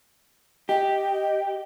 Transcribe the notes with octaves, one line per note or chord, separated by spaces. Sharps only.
G4 D#5